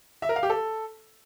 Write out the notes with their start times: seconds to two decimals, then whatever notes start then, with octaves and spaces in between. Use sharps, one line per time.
0.22 E5
0.29 A#4
0.36 F5
0.43 G4
0.50 A4